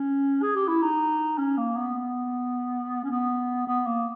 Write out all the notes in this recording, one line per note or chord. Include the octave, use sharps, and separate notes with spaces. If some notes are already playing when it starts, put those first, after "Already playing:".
Already playing: C#4
G#4
G4
E4
D#4
C#4
A#3
B3
C#4
B3
B3
A#3